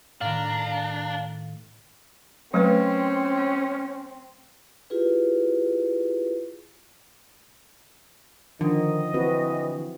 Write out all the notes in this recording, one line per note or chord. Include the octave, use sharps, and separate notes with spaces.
A2 D#3 D4 F5 A#5
F#3 A3 C4 C#4 B4
E4 F4 G4 G#4 B4
D3 D#3 F3 D#5
E3 C4 F#4 B4